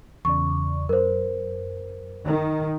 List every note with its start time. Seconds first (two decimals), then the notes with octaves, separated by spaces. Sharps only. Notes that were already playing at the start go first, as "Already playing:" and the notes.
0.25 E2 C#3 D5 C#6
0.89 F#2 A#4 C5
2.26 D#3